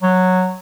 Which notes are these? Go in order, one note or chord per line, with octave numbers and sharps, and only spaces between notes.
F#3